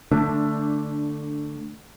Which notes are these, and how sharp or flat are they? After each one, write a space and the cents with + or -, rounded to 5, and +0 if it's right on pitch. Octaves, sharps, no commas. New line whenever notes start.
D3 +10 A3 +10 D4 -5